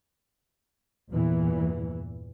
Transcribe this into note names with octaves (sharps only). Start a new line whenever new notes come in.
E2 G2 A#2 E3